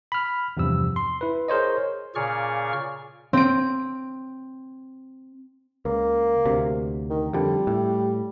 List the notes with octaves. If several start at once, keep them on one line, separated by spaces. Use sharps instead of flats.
B5 F6
E2 G2 C3 F3 E6
C6
E4 B4
G#4 A#4 C5 C#5 D#5
A#2 C#3 G#4 D5 C#6 F6
C4 D7
C#2 A#3
D2 C3
D#3
F2 D3 G3
A2